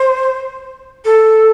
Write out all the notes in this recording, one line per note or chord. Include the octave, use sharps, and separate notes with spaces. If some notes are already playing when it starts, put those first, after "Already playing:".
Already playing: C5
A4